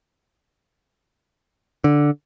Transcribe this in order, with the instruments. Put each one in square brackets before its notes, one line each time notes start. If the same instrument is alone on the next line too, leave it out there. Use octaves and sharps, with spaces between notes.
[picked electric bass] D3